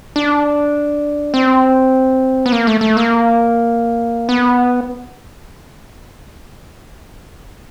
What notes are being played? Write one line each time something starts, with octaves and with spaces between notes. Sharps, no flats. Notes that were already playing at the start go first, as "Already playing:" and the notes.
D4
C4
B3
A#3
A3
A3
A#3
B3